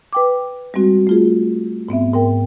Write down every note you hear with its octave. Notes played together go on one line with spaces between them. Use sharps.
B4 G5 D6
G3 G#3 C4 F#4
A3 F4 G#4
G#2 B3 C4 E5
G#2 A#4 G5